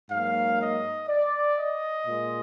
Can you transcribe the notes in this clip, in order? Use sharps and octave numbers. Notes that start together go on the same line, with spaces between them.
G#2 F#3 A#3 F5
D#5
D5
D#5
A#2 G#3